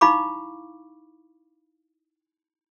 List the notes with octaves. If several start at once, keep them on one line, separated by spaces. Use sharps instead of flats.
D#4 E4 F5 B5 C#6 D6